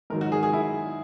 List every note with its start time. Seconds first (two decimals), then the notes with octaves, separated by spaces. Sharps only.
0.10 G#2 D#3 F#3 A#4
0.21 F#4
0.32 G#4
0.43 G#4
0.53 E4